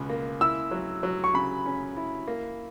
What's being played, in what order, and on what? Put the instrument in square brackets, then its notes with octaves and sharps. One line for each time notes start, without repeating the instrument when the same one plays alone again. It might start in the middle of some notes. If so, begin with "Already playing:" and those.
Already playing: [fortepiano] C#2 B2
A#3
[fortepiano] E4 [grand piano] E6
[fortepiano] F#3
F#3
[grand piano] C#6
[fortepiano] C#3 [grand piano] B5
[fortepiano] C#4
E4
A#3